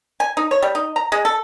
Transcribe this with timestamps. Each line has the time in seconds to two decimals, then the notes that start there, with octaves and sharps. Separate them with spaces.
0.20 G#5
0.37 D#4
0.51 C#5
0.62 G3
0.75 D#4
0.96 A#5
1.12 G#3
1.25 A4